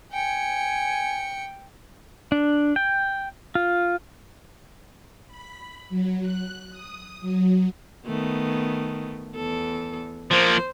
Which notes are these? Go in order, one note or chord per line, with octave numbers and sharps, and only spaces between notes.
G5 G#5 C#7
D4
G5
F4
B5
F#3
F#6
D#6
F#3
D#3 A3 B3
E2 A4
F3 A#3 C5